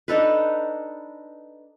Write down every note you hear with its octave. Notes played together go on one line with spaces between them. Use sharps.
D4 D#4 A4 B4